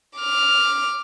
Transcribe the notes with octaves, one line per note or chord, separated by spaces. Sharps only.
D6 F6